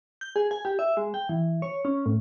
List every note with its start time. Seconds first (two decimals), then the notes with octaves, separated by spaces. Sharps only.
0.21 G6
0.36 G#4
0.51 G#5
0.65 G4
0.79 E5
0.97 G#3
1.14 G5
1.29 E3
1.62 C#5
1.85 C#4
2.06 A2